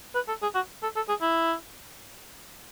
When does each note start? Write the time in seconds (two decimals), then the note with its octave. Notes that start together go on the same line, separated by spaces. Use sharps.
0.15 B4
0.28 A4
0.42 G#4
0.55 F#4
0.83 A4
0.96 A4
1.09 G#4
1.22 E4